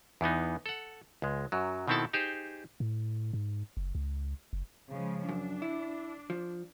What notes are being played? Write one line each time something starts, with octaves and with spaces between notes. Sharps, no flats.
E2 E3 B3 D#4
A4 F#5
C#2 G#3
F#2 F#3
B2 D#3 C4 E4 A4 A5
D#4 G4 G#4 C5
A2
G#2
F#1
C#2
F#1
C#3 F3 G#3
F#2 D4
E4
F3